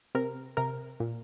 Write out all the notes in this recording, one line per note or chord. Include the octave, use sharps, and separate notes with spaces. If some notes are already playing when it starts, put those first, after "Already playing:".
C3 A#4
C3 A#4
A#2